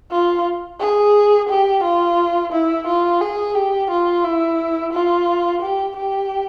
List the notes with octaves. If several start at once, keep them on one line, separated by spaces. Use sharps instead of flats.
F4
G#4
G4
F4
E4
F4
G#4
G4
F4
E4
F4
G4
G4